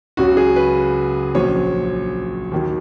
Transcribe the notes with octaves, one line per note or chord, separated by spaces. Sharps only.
C#2 C#3 F#3 C#4 F#4
G#4
B4
A#1 A#2 F#3 C#4 C#5
D#2 D#3 F#3